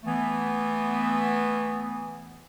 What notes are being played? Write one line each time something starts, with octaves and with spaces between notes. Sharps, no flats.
E3 A3 B3